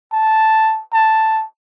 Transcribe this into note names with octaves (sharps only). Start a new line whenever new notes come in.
A5
A5